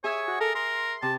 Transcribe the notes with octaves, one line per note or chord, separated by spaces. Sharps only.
G#4 C#5 E5 G#5 D#6
F#4
A4 A#4
A#4 C6
C3 A5